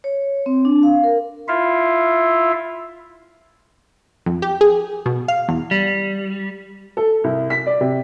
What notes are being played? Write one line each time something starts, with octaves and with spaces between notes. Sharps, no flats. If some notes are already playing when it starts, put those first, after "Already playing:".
C#5
C4
D4
F5
A#4
E4 F4 E5 F5
F2
G4
G#4
B2
F5
E2
G3
A4
C2
B6
D5
C3